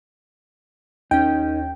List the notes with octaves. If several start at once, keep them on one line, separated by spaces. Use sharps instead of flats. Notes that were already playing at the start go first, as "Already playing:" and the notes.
D#2 C#4 D#4 G5